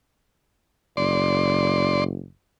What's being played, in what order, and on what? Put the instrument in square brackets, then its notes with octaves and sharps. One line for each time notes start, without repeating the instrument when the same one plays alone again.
[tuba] F#1 [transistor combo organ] D5 C6